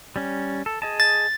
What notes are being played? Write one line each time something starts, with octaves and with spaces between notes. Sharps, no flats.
G3 C#4
A4
G#4 D#5 A5
A6